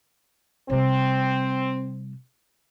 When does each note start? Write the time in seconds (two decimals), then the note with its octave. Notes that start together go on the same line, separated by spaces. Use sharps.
0.70 C3 G3 C4